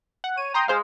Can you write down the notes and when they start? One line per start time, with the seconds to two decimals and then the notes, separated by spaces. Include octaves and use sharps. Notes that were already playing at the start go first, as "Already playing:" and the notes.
0.24 F#5
0.37 C#5 D#7
0.54 G5 A#5 C6 D#6
0.68 G#3 G#4 C5 F5